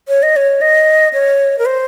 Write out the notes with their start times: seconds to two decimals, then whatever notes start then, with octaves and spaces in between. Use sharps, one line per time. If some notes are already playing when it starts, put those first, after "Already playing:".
0.08 C#5
0.23 D#5
0.36 C#5
0.61 D#5
1.13 C#5
1.59 A#4
1.66 C5